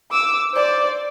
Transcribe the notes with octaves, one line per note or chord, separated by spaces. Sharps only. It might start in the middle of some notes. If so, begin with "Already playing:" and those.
D6 E6
C5 D5